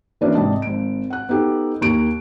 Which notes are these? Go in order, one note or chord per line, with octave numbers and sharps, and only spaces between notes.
E3 A#3 C#4 D4 F#4 B4
G#2 C3 D5 D#5 A5
G#1 D7
F#5 F#6
B3 D#4 G4 A4
D#2 A#3 C#6 D7